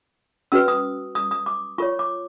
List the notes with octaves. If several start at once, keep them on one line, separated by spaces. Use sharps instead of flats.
C#4 F#4 B4 E6
D#6
D#6
D#6
D6
F4 A#4 C#5 C#6
D6